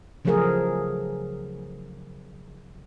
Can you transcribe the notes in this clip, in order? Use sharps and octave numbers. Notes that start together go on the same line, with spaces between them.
C#3 F3 F#3 A3 G#4 A#4